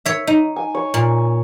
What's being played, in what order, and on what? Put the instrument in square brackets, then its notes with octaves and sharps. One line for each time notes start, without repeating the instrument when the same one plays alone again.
[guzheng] C#5 E5
D#4
[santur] G#5
C#5
[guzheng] A#2